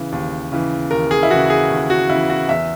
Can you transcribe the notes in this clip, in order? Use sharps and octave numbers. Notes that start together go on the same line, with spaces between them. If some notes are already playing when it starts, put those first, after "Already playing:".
Already playing: C#3 E3
D#2
C#3 E3
D#2 A#4
G#4
E4
C#3 E3 F#4
G#4
D#2
F#4
C#3 E3 E4
F#4
E2 E5